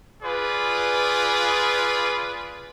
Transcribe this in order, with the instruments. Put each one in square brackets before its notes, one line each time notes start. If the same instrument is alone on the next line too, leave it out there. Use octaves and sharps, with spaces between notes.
[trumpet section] F4 G#4 B4 D5